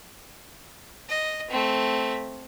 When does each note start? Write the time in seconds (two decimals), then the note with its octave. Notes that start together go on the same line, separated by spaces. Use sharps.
1.09 D#5
1.51 A3 C4